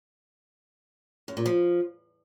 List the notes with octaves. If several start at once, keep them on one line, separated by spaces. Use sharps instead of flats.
F#2
A#2
F3